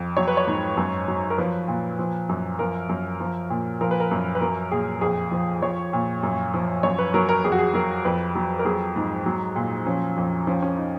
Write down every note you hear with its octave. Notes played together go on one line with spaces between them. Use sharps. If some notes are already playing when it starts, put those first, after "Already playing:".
Already playing: F2
F#3 C#5
B4
C#5
G#2
F#2
F#3
A#4
F3 B4
A#2
F3
F#2
F3 A#4
F#2
F3
A#2
F3 A#4
B4
A#4
F#2
B4
F#3 A#4
A#2 G#4
F2 G#4
F3
F3 C#5
A#2
F#2
F3
F#2 C#5
B4
F#3 A#4
A#4
F2 G#4
F#4
G#4
F#3 A#4
F2 B4
F#3
A#4
F#3 G#4
G#2
F#3
A#2
F3 C#4
F2
F3 C#4
C#4
D#4